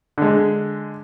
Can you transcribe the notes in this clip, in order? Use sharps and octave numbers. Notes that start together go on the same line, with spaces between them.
D3 G#3